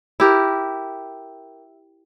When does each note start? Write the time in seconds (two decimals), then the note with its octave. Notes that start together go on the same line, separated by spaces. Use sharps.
0.20 E4 G4 A#4